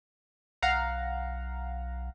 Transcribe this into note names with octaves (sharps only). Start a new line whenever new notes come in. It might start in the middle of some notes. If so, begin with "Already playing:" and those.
B1 F5 F#5 A#5